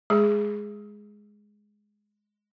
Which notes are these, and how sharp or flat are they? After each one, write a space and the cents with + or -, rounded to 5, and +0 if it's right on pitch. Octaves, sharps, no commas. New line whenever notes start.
G#3 +0 G#4 +0